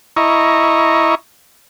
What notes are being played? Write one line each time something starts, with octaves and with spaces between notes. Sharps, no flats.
E4 D#5 A#5 C#6